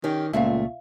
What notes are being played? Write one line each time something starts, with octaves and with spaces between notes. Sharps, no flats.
D#3 C#4 G4
C#2 A#2 A3 E5 F5